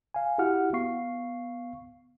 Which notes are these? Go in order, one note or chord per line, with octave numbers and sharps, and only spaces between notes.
F5 G#5
E4 F#4 G4 F#5 F6
B3 F5 C#6 C7